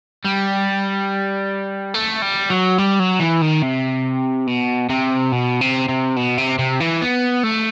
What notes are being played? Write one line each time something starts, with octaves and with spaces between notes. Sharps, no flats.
G3
A3
G3
F#3
G3
F#3
E3
D#3
C3
B2
C3
B2
C3
C3
B2
C3
C3
E3
B3
A3